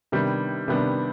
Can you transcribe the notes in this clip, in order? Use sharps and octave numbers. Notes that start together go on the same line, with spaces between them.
C3 D#3 G3 B3 D4
C3 D#3 G3 B3 D4